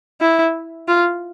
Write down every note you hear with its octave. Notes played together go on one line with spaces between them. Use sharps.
E4
F4